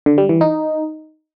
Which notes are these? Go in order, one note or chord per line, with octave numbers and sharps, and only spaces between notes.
D3
G3
E3
D#4